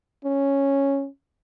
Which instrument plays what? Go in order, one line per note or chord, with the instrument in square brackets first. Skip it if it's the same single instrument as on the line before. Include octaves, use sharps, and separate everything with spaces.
[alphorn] C#4